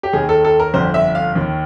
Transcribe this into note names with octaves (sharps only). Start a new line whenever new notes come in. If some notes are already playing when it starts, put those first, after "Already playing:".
G4
D#2 D#3 G#4
A4
A4
A#4
G1 F2 D3 C5
E5
F5
D#2 D#3